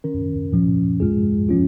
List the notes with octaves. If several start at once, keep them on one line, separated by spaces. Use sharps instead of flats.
D#3 C#4 A#4
A#2 F3 C#4
G#3 F4 G#4
F3 C#4 F4